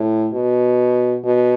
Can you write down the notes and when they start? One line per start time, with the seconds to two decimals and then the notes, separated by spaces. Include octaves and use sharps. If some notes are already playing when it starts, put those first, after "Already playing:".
Already playing: A2
0.33 B2
1.25 B2